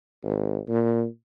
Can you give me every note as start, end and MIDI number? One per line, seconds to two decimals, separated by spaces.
0.24 0.58 32
0.68 1.05 46